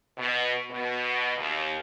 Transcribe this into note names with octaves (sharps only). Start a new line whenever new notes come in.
B2
B2
D#2